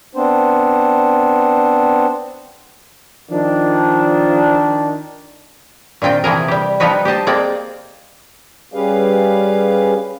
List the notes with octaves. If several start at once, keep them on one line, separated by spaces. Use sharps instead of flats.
B3 C4 D4 C5
D#3 F3 D4
A#2 D#3 C4 F4 G5
C3 E3 F3 G#4 A#4
G3 G4
F3 G3 B3 D#4 F#4 B4
G4 C5 D#5 A5
G#3 A#3 C4 D5
G3 C#4 G4 G#4 B4 F5